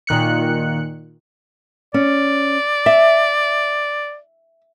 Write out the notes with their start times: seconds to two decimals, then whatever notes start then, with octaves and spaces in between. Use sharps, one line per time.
0.07 A#2 D#3 F#6 C#7
1.94 C#4 D5
2.86 E5